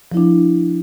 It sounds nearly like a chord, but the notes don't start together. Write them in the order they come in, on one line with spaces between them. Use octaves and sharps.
F3 E4 D4